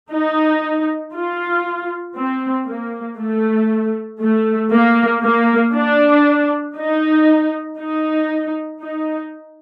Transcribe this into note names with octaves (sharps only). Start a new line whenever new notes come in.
D#4
F4
C4
A#3
A3
A3
A#3
A#3
D4
D#4
D#4
D#4